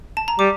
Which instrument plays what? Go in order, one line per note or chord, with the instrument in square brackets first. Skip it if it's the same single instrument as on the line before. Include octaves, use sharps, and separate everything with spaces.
[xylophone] A5
A#5
[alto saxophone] G3 [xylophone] D6